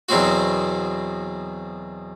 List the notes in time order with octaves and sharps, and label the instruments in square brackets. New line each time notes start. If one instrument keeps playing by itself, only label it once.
[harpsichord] E2 B2 F#3 C4 F#4